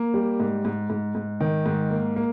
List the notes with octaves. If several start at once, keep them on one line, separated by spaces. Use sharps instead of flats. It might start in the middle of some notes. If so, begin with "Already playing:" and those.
Already playing: A#3
G3
G#2
G#2
G#2
G#2
D#3
G#2
A#3
A#3